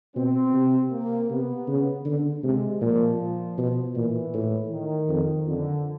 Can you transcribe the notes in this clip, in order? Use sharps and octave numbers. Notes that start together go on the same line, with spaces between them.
B2 C4
C3
A#3
C3 B3
C#3
D3
C3 G#3
A#2 F3
B2
A#2 E3
A2
D#3
F2
F2 D3